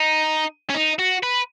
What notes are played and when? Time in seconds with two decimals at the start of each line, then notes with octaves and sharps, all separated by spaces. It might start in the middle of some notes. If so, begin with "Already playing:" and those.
Already playing: D#4
0.70 C#4
0.75 D#4
0.99 F#4
1.23 B4